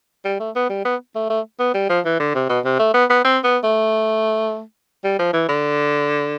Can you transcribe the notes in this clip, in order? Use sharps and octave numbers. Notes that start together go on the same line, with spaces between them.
G3
A3
B3
G3
B3
A3
A3
B3
G3
F3
E3
D3
C3
B2
C3
A3
B3
B3
C4
B3
A3
G3
F3
E3
D3